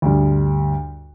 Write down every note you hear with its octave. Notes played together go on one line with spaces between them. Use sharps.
D2 G2